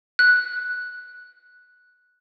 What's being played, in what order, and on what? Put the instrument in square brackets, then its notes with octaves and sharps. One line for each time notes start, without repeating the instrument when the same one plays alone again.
[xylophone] F#6